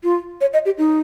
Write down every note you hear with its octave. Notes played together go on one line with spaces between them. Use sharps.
F4
C#5
D#5
G4
D#4